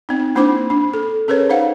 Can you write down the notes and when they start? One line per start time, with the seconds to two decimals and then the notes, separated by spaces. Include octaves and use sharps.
0.09 C4 D#4
0.35 A#3 D4 E4 C5 D6
0.70 D4
0.94 A4
1.28 C#4 G#4 A#4 B4 C#5
1.49 D#4 C5 F5 F#5